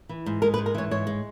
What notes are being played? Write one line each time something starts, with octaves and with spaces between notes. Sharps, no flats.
E3
G#2
G#3 A#4
B4
G#2
A#4
E3 C#5
G#2 C#5
G#3